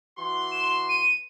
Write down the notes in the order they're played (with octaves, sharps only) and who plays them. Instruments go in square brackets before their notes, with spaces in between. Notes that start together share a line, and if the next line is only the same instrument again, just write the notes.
[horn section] E3 F#4 C6
[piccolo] E7
D#7